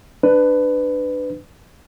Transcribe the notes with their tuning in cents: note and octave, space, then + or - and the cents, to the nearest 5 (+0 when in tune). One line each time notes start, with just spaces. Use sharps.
D4 +20 B4 +20